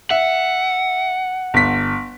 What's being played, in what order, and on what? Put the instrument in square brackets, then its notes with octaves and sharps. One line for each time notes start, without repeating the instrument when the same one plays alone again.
[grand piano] E5 [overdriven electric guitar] F#5
[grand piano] G1 B6